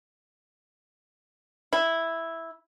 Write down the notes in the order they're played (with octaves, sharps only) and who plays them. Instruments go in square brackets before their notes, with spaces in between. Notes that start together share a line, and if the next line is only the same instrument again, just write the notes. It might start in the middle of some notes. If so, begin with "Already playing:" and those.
[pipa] E4